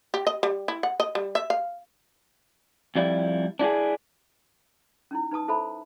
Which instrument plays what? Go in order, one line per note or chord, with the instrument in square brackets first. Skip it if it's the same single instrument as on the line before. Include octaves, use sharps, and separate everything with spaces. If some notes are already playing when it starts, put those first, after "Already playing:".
[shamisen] G4
D#5
G3
E4
F#5
D#5
G3
E5
F5
[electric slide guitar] F2 G3 E4
D4 E4 F#4 G#4
[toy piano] C#4 D#4 E4
D#4 B4 A5 D#6
E4 A4 C5 E5 A5 B5